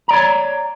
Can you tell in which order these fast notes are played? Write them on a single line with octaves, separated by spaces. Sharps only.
A#5 D5 C#5